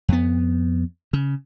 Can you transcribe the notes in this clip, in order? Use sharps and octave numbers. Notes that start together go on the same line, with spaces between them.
F2 B3
C#3